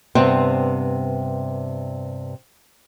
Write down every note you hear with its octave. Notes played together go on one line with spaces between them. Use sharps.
G2 C3 B3 C4